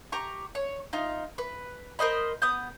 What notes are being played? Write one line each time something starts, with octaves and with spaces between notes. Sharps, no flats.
G4 A#5 C#6
C#5
D#4 F4
B4
A#4 C5 D#5 B5
B3 D#6 G6